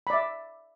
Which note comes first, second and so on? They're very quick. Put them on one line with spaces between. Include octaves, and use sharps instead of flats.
B5 D5 E5